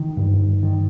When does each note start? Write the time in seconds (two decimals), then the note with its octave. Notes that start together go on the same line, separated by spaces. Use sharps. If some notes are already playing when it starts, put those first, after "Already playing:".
Already playing: D#3
0.17 G2
0.63 D#3